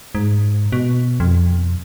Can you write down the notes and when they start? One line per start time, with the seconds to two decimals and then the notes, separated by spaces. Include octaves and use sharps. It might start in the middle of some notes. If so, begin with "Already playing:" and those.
0.15 G#2
0.72 B2
1.20 F2